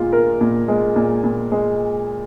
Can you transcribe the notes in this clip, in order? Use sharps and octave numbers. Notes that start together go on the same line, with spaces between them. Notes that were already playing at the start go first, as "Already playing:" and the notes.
Already playing: A#2 G#3 F4
A#4
A#2
G#3
A#2
A#2
G#3